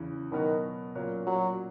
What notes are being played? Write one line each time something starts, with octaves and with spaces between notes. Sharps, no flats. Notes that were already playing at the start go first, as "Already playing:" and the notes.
Already playing: E2 C#3 E3
B2 D#3 F#3 B3 F#4 A#4
A#2 F#3 C#4 F#4 A#4
F#3